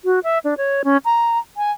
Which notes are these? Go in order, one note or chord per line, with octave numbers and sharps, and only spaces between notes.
F#4
E5
D4
C#5
C#4
A#5
G#5